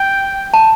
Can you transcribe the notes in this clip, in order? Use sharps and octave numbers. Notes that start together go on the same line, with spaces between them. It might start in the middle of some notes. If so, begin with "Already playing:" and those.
Already playing: G5
A5